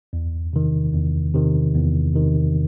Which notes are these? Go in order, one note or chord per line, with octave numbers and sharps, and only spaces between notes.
E2
C3 D#3
E2
C3 D#3
E2
C3 D#3